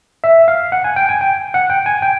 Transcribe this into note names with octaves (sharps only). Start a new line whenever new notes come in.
E5
F5
F#5
G#5
G5
G#5
G5
F#5
G5
G#5
G5